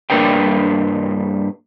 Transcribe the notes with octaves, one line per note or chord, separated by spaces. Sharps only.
G2 A#3 D4 A#4 B4 G5